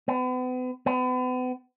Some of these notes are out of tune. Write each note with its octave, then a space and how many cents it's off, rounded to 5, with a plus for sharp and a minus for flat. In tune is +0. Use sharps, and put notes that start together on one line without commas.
B3 +40
B3 +40